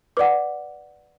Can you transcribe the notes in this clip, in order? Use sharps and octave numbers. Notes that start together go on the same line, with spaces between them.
B4 D5 F#5 D6